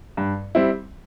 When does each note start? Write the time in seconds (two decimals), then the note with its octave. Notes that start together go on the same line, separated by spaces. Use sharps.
0.17 G2
0.55 G3 C4 E4